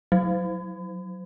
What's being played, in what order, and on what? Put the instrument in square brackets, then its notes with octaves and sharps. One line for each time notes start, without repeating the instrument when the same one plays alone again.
[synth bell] F#3